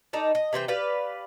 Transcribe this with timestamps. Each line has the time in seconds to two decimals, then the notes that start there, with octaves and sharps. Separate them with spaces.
0.13 D#4 A4 D5
0.35 D#5
0.53 C3 E3 C4 G5
0.68 G4 B4 D5 F5